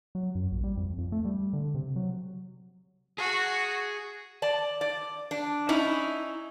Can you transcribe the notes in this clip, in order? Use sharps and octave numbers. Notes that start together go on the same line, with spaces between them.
F#3
F#2
A#1
G3
F2
F2
A3
G3
D3
C3
F#3
F#4 G#4
D5 A5
D5
D4
C#4 D#4 E4